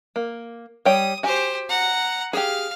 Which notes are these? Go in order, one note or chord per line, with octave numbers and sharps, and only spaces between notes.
A#3
G3 C#5 G5 D#6
F#4 G4 C5 G#5
F#5 A#5
G4 G#4 F5 F6